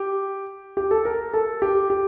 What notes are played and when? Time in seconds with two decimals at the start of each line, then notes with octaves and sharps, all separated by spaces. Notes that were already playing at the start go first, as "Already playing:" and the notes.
Already playing: G4
0.77 G4
0.91 A4
1.05 A#4
1.34 A4
1.62 G4
1.90 G4